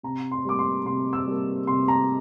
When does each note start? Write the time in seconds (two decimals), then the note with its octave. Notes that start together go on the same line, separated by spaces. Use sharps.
0.03 C3 A#5
0.32 C6
0.45 G3 A#3 D6
0.59 C6
0.86 C3 C6
1.13 E6
1.27 G3 A#3
1.67 C3 C6
1.88 A#5